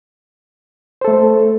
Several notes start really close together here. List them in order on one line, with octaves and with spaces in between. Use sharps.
C5 A4 A3